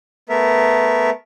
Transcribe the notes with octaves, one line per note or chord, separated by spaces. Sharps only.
A3 B3 A#4 E5